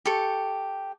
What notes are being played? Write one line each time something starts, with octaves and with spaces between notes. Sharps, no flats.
G4 A4 C#6